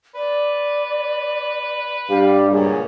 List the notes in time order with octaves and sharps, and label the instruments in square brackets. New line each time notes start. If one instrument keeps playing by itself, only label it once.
[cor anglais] B4 [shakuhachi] D5
[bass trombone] G2 [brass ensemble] G3 G4 [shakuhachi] F5
[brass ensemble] C#2 F#2 A#2 [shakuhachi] G#4